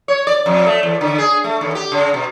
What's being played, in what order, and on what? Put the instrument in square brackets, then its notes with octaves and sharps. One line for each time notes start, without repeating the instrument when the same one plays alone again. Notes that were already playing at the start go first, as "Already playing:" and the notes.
[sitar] C#5
D5
F2
A3
E2
D3
G#4
A3
D#2
G4
C#3
B2